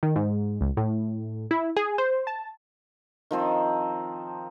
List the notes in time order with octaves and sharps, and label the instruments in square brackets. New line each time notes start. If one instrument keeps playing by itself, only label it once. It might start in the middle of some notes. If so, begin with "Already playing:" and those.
[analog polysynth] D#3
G#2
C#2
A2
E4
G#4
C5
A5
[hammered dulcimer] D#3 F3 C4